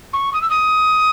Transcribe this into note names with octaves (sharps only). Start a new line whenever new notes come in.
C#6
D#6
E6
D#6